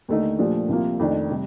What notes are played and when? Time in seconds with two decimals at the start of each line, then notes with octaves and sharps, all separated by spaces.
0.08 D#2 D3 A3 D#4
0.39 A#2 F3 A3 D4 G4
0.69 C2 C3 F3 A#3 F4
0.99 F2 D#3 A3 D4
1.30 C3 G3